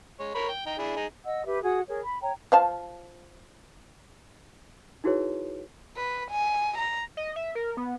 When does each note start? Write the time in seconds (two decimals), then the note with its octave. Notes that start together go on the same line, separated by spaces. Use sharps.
0.19 G#3 C#5
0.35 A#4 C#5 B5
0.49 G5
0.66 D#4 G5
0.78 D4 E4 G#4
0.96 D#4 G#4
1.25 D#5 F#5 E6
1.46 G4 B4 E5
1.63 F#4 G#4 G#5 D#6
1.89 G#4 A#4 C#5
2.04 B5
2.22 C#5 G5 A#5
2.52 F3 F5 A5
5.04 D#4 E4 F#4 G#4 B4 C#5
5.96 B4
6.31 G#5
6.78 A#5
7.17 D#5
7.36 E5
7.55 A#4
7.77 B3